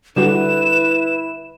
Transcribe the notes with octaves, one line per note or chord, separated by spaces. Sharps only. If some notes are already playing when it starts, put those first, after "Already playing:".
D3 G3 E4 F#4 B4 E7